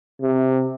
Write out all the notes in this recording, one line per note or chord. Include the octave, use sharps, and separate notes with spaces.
C3